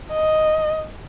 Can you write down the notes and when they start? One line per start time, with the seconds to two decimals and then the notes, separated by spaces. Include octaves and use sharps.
0.13 D#5